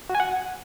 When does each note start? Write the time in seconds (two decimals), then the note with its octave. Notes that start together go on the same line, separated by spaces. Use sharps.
0.10 F#4
0.15 G#5
0.20 F#5